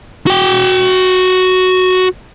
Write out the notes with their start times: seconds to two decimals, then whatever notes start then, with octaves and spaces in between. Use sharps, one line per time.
0.27 F#4 G5